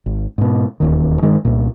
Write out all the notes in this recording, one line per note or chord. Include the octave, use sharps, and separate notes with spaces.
G#1
G#2 B2
E1 D#2 D#3
G2 D#3 G#3
C2 A#2